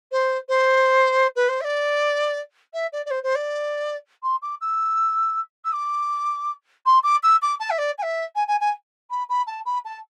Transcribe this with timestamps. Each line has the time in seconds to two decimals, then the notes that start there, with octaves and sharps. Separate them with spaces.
0.12 C5
0.49 C5
1.36 B4
1.48 C5
1.61 E5
1.64 D5
2.73 E5
2.92 D5
3.06 D5
3.10 C5
3.23 C5
3.35 D5
4.23 C6
4.42 D6
4.61 E6
5.64 E6
5.72 D6
6.86 C6
7.03 D6
7.23 E6
7.42 D6
7.60 A5
7.70 E5
7.78 D5
7.98 G#5
8.02 E5
8.35 G#5
8.47 G#5
8.60 G#5
9.10 B5
9.29 B5
9.47 A5
9.65 B5
9.85 A5